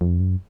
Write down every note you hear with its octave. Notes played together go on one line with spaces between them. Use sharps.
F2
F#2